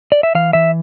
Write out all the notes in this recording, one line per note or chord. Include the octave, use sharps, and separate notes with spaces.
D5
E5
E3 F5
E3 E5